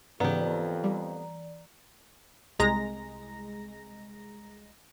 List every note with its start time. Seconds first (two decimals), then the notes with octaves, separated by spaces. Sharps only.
0.20 F2 G#2 C#3 E3 B3 G4 D5 A#5
0.84 G3
2.59 C2 G#3 A#5 A#6